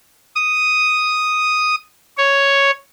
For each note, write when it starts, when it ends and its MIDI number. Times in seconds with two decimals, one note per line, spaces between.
0.36 1.76 87
2.18 2.71 73